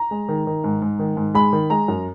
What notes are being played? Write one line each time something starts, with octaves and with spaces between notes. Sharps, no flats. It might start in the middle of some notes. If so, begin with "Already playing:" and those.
Already playing: A#5
G#3
D#3
D#3
G#2
G#2
D#3
G#2
G#3 B5
D#3
G#3 A#5
F#2